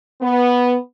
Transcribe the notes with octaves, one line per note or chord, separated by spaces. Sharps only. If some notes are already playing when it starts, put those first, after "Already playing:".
B3